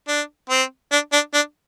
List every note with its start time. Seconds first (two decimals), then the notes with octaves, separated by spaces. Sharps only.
0.08 D4
0.50 C4
0.92 D4
1.13 D4
1.34 D4